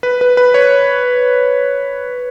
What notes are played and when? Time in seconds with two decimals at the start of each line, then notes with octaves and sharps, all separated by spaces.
0.03 B4
0.21 B4
0.37 B4
0.54 C#5